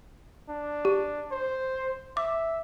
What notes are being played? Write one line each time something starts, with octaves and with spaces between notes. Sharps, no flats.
D4
G4
C5
E5 D6